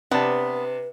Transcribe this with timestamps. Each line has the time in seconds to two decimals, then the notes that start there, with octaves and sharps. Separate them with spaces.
0.11 C3 B3 D4 B4 A5